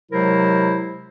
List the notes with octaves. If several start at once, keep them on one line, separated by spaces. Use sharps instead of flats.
C3 F#3 G#3 E4 A#4 C5